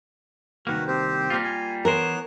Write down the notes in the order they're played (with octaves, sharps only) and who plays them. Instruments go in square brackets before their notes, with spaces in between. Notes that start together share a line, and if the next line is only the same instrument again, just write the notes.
[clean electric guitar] C2 D#3 A#3 [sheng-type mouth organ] F#4 B4
[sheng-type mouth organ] C4 G4 C5
[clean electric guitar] G3 A#3 F4
[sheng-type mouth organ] G#5
[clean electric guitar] E3 C5 [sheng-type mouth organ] B3 C#5 F#6 [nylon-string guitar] A#4